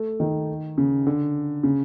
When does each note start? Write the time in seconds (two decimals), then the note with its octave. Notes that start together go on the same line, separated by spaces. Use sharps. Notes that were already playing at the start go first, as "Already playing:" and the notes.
Already playing: A3
0.20 D#3
0.78 C#3
1.07 D3
1.63 C#3